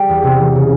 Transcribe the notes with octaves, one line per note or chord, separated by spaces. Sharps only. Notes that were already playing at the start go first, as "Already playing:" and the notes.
Already playing: G3
E2
C3
E3
C#3